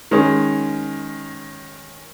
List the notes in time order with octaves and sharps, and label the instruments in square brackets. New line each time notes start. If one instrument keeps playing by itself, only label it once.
[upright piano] D#3 G#3 C#4